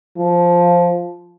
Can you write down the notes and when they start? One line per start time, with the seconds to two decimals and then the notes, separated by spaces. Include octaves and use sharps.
0.17 F3